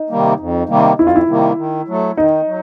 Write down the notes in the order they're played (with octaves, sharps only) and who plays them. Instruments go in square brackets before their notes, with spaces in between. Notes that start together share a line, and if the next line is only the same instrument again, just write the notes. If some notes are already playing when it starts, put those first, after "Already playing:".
Already playing: [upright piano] D#4
[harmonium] C3 D#3 G3 A#3
F2
C3 D#3 G3 A#3
[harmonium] F2 [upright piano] E4
[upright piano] F4
E4
[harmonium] C3 D#3 G3 A#3
D#3
F#3 A3
[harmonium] D#3 [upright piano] D#4
[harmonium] F#3